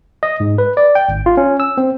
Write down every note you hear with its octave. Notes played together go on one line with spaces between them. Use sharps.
D#5
G#2
B4
D5
G5
G#1
F4
C#4
E6
C4